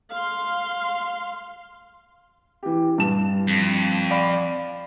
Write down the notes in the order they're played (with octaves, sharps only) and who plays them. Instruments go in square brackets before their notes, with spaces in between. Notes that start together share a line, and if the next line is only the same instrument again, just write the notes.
[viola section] F5 C6
[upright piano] E3 G4
G2 A5 E7
[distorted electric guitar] F2
[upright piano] D5 F5 B5